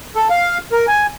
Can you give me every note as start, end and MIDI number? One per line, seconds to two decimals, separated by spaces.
0.15 0.29 69
0.30 0.58 77
0.72 0.86 70
0.88 1.07 80